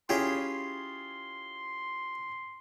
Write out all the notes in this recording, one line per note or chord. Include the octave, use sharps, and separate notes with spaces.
C#4 E4 F4 G4 G#4 C6